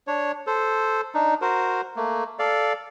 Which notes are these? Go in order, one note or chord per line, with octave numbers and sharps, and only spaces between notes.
D4 C#5
A4 C5
D4 D#4
F#4 A#4 C5
A3 A#3
A4 D5 F5